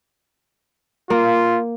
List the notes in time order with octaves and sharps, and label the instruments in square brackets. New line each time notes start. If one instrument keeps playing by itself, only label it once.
[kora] A#3 [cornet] F4